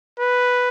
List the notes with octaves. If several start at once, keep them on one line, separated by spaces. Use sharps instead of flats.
B4